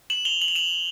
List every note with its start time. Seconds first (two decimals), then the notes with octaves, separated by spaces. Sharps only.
0.10 E7 F#7
0.25 F7 G7
0.42 F#7
0.48 F7
0.55 E7 F#7